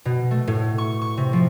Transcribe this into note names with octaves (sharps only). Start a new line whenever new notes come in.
B2
A3
A2
C#6
C#6
C3
F3